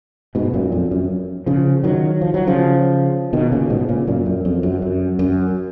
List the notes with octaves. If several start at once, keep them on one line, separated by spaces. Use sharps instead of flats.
G#2 B2
F#2 A#2
F2
F#2
C#3 F3
D#3 F#3
F3
F#3
C#3 F3
B2 D#3
A#2 C#3
G#2 B2
A#2 C#3
F#2 A#2
F#2
F2
F#2
F#2
F#2